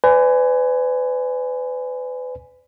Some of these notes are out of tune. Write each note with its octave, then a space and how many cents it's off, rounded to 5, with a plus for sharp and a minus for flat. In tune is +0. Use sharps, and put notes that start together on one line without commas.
B4 +35 D5 -15 G#5 +0